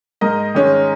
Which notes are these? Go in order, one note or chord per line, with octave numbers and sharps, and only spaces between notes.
G#2 A#4 D#5
D#3 G#3 C#4